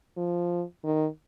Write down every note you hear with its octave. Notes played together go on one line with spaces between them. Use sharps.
F3
D#3